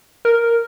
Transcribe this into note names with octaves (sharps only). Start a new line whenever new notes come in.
A#4